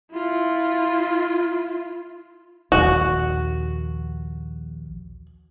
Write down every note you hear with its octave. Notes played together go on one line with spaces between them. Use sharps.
E4 F4
A#1 D#2 F#4